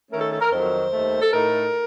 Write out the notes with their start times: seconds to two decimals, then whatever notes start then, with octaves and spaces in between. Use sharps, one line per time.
0.11 D#3 A3 C#4 A#4
0.21 A4
0.31 A4
0.41 A#4
0.51 F2 D#3 F#3 C5
0.92 D#2 D#3 A3
1.22 A4
1.32 A2 A3 D#4 A#4